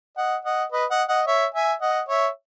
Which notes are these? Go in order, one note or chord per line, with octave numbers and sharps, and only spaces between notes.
D#5 F#5
D#5 F#5
B4 D#5
D#5 F#5
D#5 F#5
C#5 E5
E5 G#5
D#5 F#5
C#5 E5